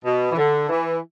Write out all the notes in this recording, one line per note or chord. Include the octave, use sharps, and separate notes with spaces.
B2
E3
D3
E3